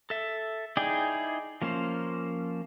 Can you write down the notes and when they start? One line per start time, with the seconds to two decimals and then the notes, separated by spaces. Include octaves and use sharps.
0.10 A4 E5
0.77 D#4 E4 G#4 D5 G5
1.62 F3 A#3 C#4 C5